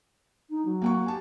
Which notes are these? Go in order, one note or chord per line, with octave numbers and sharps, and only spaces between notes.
D#4
F#3
A#3 F#5 C#6
G4 G#5 A5